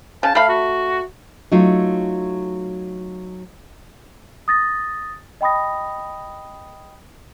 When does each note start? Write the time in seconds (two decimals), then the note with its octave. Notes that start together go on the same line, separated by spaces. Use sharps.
0.23 C#3 A5
0.35 A3 F5 B5
0.48 F#4
1.52 F#3 A3 D#4 F4
4.48 D#6 A6 A#6
5.41 D#5 G5 B5 D#6 A#6